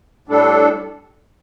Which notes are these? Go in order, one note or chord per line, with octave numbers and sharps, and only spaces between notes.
A2 G3 D4 A4